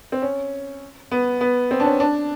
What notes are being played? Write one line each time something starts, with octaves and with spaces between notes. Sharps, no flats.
C4
C#4
B3
B3
C4
D4
C#4
D4